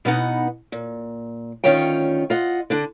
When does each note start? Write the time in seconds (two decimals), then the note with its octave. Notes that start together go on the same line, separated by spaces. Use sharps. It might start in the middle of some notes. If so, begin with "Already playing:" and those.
0.05 B2 B3 D#4 F#5
0.72 A#2
1.64 D2 D#3 C#4 F4 C#5 G5
2.30 F4 D#5 F#5
2.70 D3 D4